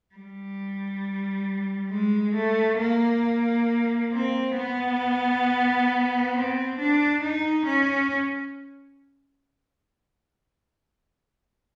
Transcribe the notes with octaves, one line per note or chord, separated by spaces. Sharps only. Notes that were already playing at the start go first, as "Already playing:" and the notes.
G3
G#3
A3
A#3
C4
B3
C4
D4
D#4
C#4